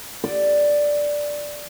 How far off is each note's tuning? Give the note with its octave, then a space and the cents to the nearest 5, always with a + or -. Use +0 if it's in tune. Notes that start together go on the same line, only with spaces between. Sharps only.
D5 +0